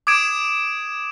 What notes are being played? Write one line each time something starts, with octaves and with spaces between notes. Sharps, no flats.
D6 D#6 G#6 D7 E7